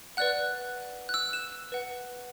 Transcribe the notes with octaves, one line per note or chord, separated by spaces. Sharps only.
B4 D5 F#5 F#6
F#6
E6
E7
B4 F#5